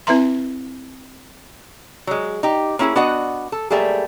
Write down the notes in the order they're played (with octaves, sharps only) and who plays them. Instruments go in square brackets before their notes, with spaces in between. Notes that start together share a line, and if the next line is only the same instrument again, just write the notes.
[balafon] C4 E4 B4 E5 A#5 C6
[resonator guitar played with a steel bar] F#3 G#3
D#4 G4
A#3 C#4 E4 G4 G#4
B3 D4 F#4 D#5 F#5
A4
F#3 G3 A3 A#3 G#4